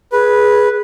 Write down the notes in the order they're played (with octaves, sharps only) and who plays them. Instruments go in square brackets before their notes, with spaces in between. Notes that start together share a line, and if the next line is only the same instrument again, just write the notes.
[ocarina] G#4 [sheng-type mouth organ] B4